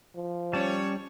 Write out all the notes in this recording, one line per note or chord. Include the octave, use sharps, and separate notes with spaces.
F3
G3 C#4 C#5 A5